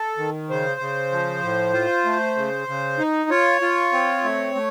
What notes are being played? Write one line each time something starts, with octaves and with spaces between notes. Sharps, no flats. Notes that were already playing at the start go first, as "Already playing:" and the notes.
Already playing: A4
D#3
C#3 C5
C#3
F3
A2
F4
A3
C#3
C#3
D#4
F4 C#5
F4
C4
A3
A3